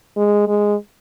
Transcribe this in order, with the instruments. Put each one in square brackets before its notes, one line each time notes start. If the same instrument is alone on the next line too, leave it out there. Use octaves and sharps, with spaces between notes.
[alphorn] G#3
G#3